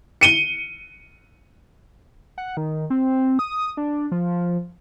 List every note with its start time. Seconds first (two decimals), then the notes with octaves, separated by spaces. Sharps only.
0.21 C#7 D#7 G7
2.38 F#5
2.57 D#3
2.90 C4
3.39 D#6
3.77 D4
4.12 F3